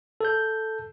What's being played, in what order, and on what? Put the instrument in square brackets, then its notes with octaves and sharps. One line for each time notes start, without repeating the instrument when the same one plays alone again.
[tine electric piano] A4 G6